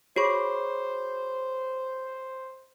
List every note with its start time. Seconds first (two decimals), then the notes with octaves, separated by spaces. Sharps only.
0.16 F#4 G#4 C5 C#5 B5 C#6 D6